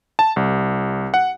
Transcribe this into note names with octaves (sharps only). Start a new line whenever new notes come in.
A5
C2
F#5